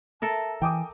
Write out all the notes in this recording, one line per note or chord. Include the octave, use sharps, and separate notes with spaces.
A4 A#4 E5 A5
E3 G5 G#5 D6 D#6